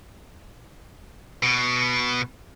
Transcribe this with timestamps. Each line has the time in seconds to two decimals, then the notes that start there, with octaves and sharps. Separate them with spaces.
1.43 B2